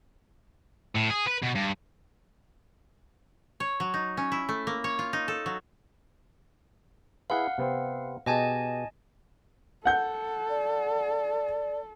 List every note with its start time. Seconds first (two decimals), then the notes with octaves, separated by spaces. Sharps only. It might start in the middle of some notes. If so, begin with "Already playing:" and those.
0.96 A2
1.11 G#4
1.28 B4
1.43 B2
1.56 G2
3.60 C#5
3.80 F#3
3.94 D#4
4.17 C#4
4.32 E4
4.49 A3
4.67 A#3
4.84 C#5
4.99 F4
5.13 D#4
5.28 A4
5.46 F#3
7.30 E4 G#4 B4 F5 F#5
7.58 C3 B3 C4
8.26 B2 G4 G#4 D#5 G#5 A5
9.85 A4 F#5 G6
10.50 D5